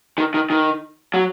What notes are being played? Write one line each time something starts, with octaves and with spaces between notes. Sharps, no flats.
D#3
D#3
D#3
F#3